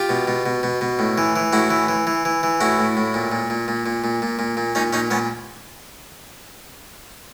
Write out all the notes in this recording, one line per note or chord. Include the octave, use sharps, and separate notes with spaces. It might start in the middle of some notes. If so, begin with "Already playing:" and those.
Already playing: F4 G4
B2
B2
B2
B2
B2
A2
E3
E3
A2 E4 F#4
E3
E3
E3
E3
E3
A2 E4 F#4
A2
A2
A#2
A#2
A#2
A#2
A#2
A#2
A#2
A#2
A#2
A#2 C#4 D#4
A#2 C#4 D#4
A#2 B3 C#4